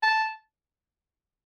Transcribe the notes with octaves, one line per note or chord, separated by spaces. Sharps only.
A5